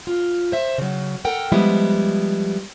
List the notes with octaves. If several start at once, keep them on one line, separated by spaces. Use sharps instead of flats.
F4
C5 E5
C#3 F#3
A4 A#4 F#5 G5
F3 G3 G#3 B3 E4